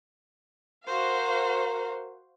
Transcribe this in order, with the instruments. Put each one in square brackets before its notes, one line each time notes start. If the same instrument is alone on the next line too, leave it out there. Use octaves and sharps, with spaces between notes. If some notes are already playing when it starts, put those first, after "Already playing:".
[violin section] F#4 C5 F5 [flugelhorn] A#4